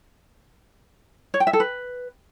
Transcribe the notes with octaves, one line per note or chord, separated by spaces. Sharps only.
C#5
G5
E5
A4
B4